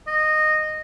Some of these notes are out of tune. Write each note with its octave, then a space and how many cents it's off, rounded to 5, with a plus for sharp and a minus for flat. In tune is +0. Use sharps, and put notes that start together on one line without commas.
D#5 -15